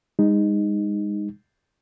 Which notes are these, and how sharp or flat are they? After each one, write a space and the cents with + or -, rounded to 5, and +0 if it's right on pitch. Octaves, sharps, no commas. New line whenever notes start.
G#3 -35 D#4 -5